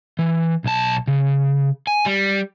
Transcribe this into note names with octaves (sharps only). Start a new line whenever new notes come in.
E3
B1 A5
C#3
G#5
G3